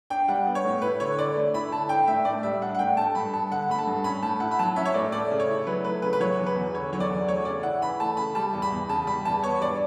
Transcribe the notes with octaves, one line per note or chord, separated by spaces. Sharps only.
D4 G5
G3 F#5
B3
C#5
A2
E4 B4
D3 C#5
D3 D5
A3
E4 B5
D3 A5
D4 G5
A2 E5
A2 D5
G3 E5
D4 F#5
F#5
A2 G5
A3 A5
G2 B5
G2 A5
D3 F#5
A3 B5
A5
G2
C#4 B5
A2 A5
E4 F#5
B5
F#3 A5
C#4 E5
C#5
A2 D5
A3 D5
C#3
C#5
E4
F#3 B4
A3 B4
C#3 B4
B4
F#3 C#5
E2
B4
E2
D3 C#5
F#3 C#5
D5
E2
A3 C#5
C#3 D5
E4 F#5
E3 B5
A3 A5
C#3 B5
G3 A5
E2
B5
E2
C#3 A5
G3 B5
E2 A5
B3 C#5
G2 D5